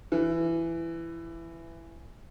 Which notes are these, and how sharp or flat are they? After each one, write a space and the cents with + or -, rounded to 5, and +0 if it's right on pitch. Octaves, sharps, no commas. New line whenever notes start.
E3 +15